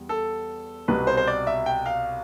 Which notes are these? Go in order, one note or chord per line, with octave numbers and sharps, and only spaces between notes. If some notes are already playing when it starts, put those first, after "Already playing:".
Already playing: E2 G3
A4
C2 B2 G3 B4
C5
C5
D5
E5
G5
F5